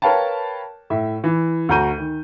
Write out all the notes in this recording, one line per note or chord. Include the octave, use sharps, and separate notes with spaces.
A#4 B4 C#5 F5 G5 A5
A2 E5
E3
D2 F#4 A#5 G6 D#7
D#3